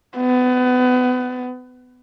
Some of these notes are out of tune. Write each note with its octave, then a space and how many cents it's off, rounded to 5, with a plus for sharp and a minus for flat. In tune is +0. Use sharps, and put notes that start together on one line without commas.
B3 +25